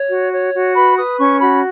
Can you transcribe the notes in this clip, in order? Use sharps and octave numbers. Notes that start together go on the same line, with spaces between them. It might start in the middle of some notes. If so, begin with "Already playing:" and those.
Already playing: C#5
F#4
C#5
F#4
B4 B5
B4 D#6
C#4 C#6
F#4 B5